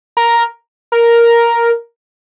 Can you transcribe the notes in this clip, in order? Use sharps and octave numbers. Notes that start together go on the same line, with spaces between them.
A#4
A#4